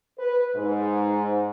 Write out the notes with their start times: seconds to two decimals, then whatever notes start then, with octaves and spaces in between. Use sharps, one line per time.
0.18 B4
0.55 G#2